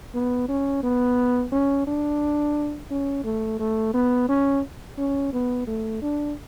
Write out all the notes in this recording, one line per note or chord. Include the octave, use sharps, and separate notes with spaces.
B3
C#4
B3
C#4
D4
C#4
A3
A3
B3
C#4
C#4
B3
A3
D4